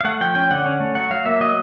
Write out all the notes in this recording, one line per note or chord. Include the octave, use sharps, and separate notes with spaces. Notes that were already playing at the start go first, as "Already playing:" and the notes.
F5
A3 F#5
F3 G5
C#4 G5
D3 F#5
C#4
A3
F#3 F#5
F#3 F5
A#3 E5
F#3 D#5